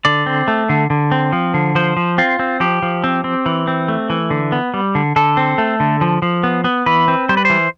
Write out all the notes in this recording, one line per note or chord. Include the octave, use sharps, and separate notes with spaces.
D3 D5
C4
A3
D3
D3
C4
F3
D3
F3 C5
F3
C4 F4
C4
F3 G4
F3
C4
C4
E3
C4
A3
E3
D3
B3
G3
D3
D3 A4
C4
A3
D3
F3
F3
B3
B3
E3 B4
C4
G3 C5
B4
E3 C5